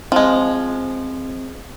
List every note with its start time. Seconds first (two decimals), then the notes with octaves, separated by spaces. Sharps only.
0.12 F3 G#3 C4